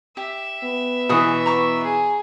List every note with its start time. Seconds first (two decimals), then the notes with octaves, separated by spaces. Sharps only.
0.17 G4 E5
0.64 B3
1.09 B2 E3 G#4 D#6
1.46 A#5 C#6 D6
1.83 G#4